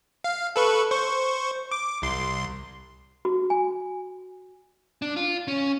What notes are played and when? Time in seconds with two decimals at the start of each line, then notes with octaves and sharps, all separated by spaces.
0.24 F5
0.56 A4 B4 C#6
0.91 C5 C#6
1.71 D6
2.02 C2 C6
3.25 F#4
3.50 G#5
5.02 D4
5.16 F4
5.48 C#4